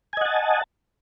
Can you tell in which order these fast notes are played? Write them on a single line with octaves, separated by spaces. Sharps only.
G#5 D#5 F#5 A5